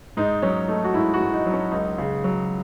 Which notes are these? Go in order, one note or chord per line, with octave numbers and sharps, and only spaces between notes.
G#2 D#4
F#3 C#4
A3 D#4
F#4
G#2 E4
F#4
G#2
D#4
F#3
C#4
C#2 D#4
C#3
F#3